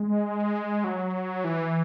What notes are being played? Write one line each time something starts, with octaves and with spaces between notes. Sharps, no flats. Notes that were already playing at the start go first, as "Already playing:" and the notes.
Already playing: G#3
F#3
E3